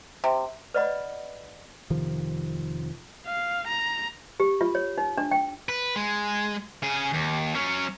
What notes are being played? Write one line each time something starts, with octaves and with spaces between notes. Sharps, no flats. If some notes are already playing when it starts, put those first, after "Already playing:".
C3
B4 D5 D#5 F#5 B5
F1 C3 D#3 F3
F5
A#5
G4
F4
C#5
D#4
D4
G5
B4
G#3
C#3 G#4
D#2
F#3 C#4